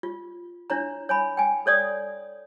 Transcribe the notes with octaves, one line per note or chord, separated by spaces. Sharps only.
F4
D4 E4 C#5 A#5
C#5 G#5 B5
G5 G#5
A4 C#5 D5 D#6